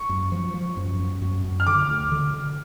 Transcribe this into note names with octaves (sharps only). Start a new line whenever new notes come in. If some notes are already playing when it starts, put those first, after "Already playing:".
Already playing: C#6
F#2
F3
F3
F#2
F#2
F#2
F#2
F6
D3 D6
D2
D3
D3